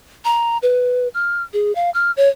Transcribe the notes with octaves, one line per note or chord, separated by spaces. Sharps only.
A#5
B4
F6
G#4
F5
F6
C#5